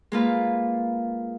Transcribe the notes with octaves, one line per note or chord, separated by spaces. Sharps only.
G#3 A#3 F4 B4